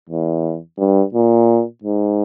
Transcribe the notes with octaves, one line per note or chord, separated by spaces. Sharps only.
E2
G2
A#2
G#2